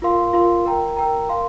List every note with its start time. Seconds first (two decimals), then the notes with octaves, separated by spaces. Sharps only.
0.02 F4 A#4 F5 C6
0.33 F4 A#4 F5 C6
0.66 A#4 G5 A#5
0.97 A#4 G5 A#5
1.29 A#4 F5 C6